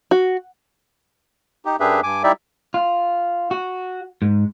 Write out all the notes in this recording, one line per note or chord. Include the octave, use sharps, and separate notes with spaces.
F#4
D#4 G4
F#2 D4 G4 G#4 B4 E5
G2 G#5 D6
G3 D#4 E4 G4 D5 E5
F4
F#4
G#2